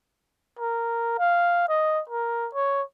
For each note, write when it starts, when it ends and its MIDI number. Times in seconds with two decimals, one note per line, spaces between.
0.59 1.16 70
1.19 1.64 77
1.69 2.01 75
2.09 2.48 70
2.54 2.82 73